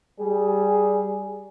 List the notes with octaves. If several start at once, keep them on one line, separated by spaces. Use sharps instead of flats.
G3 G#4